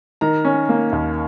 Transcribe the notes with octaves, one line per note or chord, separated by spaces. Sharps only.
D#3 A#5
C#4
A#3
D#2